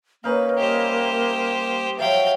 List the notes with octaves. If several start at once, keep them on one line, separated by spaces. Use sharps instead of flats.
A#3 C#4 D#4 B4 F5
G3 G4 C5 D#5 E5
F3 F#3 E5 F5 G5